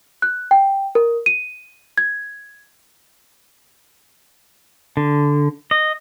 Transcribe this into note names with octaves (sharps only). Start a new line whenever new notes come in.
F#6
G5
A#4
D#7
G#6
D3
D#5